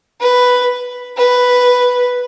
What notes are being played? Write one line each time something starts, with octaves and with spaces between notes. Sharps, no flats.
B4
B4